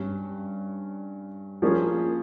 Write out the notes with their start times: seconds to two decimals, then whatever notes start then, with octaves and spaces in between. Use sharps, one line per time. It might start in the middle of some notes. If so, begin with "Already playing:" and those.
Already playing: G2 G3 C#4
1.62 F3 A#3 C#4 G#4